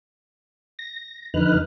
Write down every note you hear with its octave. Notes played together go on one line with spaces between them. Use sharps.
A#6
F2 D3 D#4 B4 F6 F#6